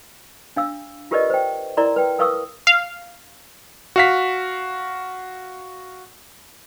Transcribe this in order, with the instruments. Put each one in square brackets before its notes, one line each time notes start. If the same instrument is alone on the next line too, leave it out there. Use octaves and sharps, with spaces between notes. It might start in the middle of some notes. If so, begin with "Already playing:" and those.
[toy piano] D4 F5 E6
F4 G4 A#4 B4 D5 D#5
C5 G5
E4 A#4 D5 A#5 C6
B4 G5
A#4 B4 F5 C#6 D#6 E6
[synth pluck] F5
[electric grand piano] F#4 F5 B6